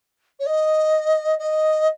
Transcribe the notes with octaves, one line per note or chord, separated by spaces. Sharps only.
C#5
D#5
D#5